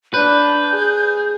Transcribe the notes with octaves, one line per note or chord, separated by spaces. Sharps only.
D4 B4 G6
G#4